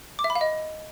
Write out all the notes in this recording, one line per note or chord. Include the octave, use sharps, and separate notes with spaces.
D6
E5
B5
F5
D#5